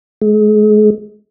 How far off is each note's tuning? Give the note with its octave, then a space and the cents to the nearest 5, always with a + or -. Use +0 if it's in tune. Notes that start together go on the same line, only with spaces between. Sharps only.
G#3 +35